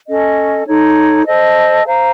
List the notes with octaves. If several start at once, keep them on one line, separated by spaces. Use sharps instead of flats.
C#4 A4 D#5
D#4 A4 C#5
A4 C5 D#5
C5 F5 A#5